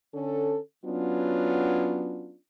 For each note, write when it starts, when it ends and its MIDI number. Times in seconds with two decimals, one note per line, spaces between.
0.14 0.58 50
0.14 0.58 61
0.14 0.58 69
0.85 2.36 54
0.85 2.36 59
0.85 2.36 61
0.85 2.36 62
0.85 2.36 65